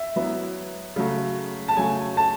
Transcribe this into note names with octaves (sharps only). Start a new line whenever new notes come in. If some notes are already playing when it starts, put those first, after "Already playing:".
Already playing: E5
F#3 B3 E4
C#3 F#3 A3
A5
C#3 F#3 A3 G#5
A5